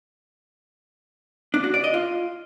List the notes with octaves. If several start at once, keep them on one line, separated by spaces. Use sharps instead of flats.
D4
F#4
D5
D#5
F4